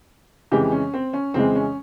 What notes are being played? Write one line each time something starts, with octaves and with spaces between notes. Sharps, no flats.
F2 C#3 E3 G#3 G4
C#4
C4
C#4
F2 C#3 E3 G#3 C4
C#4